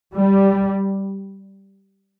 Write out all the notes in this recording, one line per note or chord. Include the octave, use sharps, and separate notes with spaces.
G3